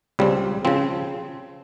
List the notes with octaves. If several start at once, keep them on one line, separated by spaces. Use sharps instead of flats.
C#2 C#3 G3 C4
C#3 F3 C4